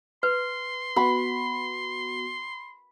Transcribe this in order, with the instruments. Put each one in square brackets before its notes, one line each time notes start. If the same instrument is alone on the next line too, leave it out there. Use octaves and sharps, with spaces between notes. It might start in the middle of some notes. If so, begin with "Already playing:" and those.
[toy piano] B4 [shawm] C6
[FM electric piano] B3 F#4 [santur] B5